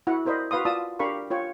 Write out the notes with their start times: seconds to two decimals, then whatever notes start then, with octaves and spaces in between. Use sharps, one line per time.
0.07 E4 F#4 F#5
0.25 E4 A#4 C5 D5 D#5 B5
0.51 F#4 B4 F5 C6 D#6
0.65 F4 D5 A5 D#6 E6
0.99 D4 G4 A#4 F5 B5 C#6
1.31 F4 C#5 G5